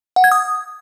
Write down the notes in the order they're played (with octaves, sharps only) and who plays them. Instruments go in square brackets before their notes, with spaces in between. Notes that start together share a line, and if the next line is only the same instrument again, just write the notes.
[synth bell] F#5
G#6
D#6